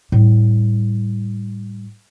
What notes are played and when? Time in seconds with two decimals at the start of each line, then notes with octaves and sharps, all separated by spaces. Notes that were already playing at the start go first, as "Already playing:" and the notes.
0.12 A2 G3